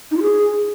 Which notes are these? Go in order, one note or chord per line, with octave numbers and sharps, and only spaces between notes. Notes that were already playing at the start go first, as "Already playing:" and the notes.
D#4
F4
G#4